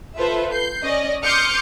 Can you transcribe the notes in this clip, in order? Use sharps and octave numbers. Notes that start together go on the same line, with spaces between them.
F4 A4 B4 C5 E5
G6 C7
C#4 D5 D#5
C6 D6 D#6 F6 G6 C#7